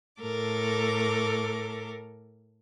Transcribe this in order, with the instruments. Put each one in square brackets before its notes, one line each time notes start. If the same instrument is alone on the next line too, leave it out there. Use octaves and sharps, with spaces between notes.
[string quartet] A2 A4 A#4 D6